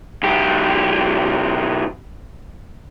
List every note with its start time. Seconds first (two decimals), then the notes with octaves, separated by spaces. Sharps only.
0.23 B1 G4